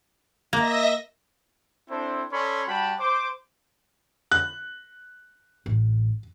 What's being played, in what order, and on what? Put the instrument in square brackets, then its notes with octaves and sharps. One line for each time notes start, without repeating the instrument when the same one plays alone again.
[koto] A#3 [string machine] D#5 E5 A#6
[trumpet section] C4 D4 E4 A4 C5
C#4 A4 C#5 D5 B5 C6
G3 F#4 G5 A5 B5
C5 D6
[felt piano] F#6
[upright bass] A1